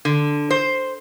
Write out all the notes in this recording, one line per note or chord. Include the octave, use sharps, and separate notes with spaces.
D3
C5